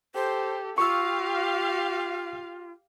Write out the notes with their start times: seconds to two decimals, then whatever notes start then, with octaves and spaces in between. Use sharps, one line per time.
0.15 G4 A4 C5
0.78 F4 G4 F5 C#6 E6